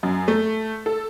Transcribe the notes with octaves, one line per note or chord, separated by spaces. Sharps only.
F#2
A3
A4